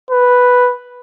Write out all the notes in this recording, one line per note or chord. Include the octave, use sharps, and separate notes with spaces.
B4